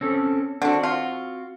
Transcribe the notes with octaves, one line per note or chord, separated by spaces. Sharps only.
C4 C#4 A4
D3 C4 D4 F#4
F4